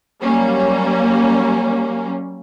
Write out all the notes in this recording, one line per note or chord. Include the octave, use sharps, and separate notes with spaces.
F#3 G3 A#3 C#4